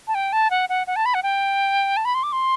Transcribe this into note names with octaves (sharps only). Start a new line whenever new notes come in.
A5
G5
A5
F#5
F#5
F#5
A5
B5
F#5
G5
A5
B5
C6
D6
C6